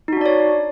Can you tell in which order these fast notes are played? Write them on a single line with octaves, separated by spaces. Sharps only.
D#4 F#4 D4 D5 C#5